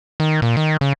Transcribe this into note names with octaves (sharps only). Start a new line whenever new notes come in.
D#3
A#2
D#3
C#3